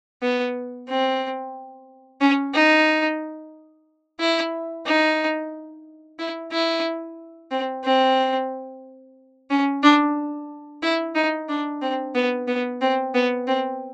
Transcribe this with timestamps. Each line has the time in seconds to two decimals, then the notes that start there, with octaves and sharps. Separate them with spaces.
0.22 B3
0.88 C4
2.21 C#4
2.54 D#4
4.20 E4
4.86 D#4
6.19 E4
6.52 E4
7.51 C4
7.84 C4
9.50 C#4
9.83 D4
10.82 E4
11.15 D#4
11.49 D4
11.82 C4
12.15 B3
12.48 B3
12.81 C4
13.14 B3
13.47 C4